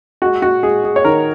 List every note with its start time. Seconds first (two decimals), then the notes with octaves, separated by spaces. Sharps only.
0.22 G#3 F#4
0.42 F#4
0.63 G#3 G#4
0.84 G#4
0.96 C#5
1.05 D#3 A#4